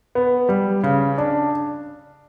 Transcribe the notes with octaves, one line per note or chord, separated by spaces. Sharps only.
B3
G3
C#3
D4